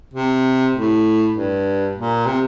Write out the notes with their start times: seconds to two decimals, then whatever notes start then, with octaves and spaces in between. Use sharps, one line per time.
0.14 C3
0.75 A2
1.35 G2
1.96 A#2
2.26 C3